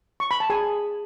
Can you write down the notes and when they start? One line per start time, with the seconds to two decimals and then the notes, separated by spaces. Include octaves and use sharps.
0.20 C#6
0.31 B5
0.40 A5
0.50 G#4 G#5